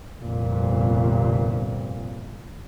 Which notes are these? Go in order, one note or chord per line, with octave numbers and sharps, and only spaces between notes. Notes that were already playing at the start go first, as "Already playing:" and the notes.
G1 C2 F2 A#2